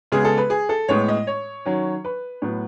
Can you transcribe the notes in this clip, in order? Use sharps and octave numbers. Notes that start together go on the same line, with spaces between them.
C#3 G#3 B3 G#4
A4
B4
G#4
A4
A2 G#3 B3 C#5
D#5
C#5
D#3 F#3 C#4
B4
A2 F#3 B3